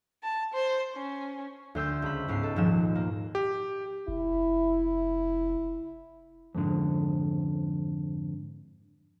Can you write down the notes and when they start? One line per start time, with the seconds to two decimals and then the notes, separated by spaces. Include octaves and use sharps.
0.23 A5
0.53 C5
0.94 C#4
1.75 D2 C5 E6 G6
2.02 C#2 B5
2.28 C#2 G#2 B3 C7
2.43 A4
2.56 D#1 G#2 F3 E7
2.95 A#3
3.35 G4
4.08 F1 E4
6.55 F2 G#2 D3